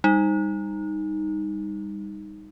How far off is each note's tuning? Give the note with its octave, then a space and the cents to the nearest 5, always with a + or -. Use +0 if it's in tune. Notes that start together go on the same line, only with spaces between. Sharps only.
G3 +25 D#4 +0